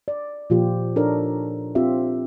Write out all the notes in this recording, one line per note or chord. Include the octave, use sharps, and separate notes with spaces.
D5
A#2 F3 F4 G4
D4 D#4 A4 A#4 C#5
C4 F4 G4 E5